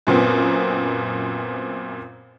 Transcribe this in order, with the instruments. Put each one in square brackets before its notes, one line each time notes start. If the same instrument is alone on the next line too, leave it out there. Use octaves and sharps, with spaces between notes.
[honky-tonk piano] F#2 A#2 B3 C4